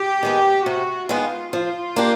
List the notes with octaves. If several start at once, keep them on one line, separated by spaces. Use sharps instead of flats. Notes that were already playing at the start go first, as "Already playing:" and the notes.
Already playing: G4
D#3 G#3 B3
C3 F#4
D#3 G#3 B3 F4
F3 F4
A#3 D4 G4